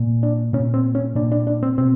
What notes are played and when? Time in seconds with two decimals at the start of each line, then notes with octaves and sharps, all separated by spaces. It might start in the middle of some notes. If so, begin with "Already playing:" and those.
Already playing: A#2
0.23 D4
0.53 A#2 C#4
0.74 C4
0.95 C#4
1.15 A#2 D4
1.32 D4
1.47 D4
1.63 C4
1.78 B2 C4